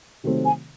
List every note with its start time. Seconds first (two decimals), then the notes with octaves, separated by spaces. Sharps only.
0.24 C3 D#3 F#3 A3 C4
0.45 G#5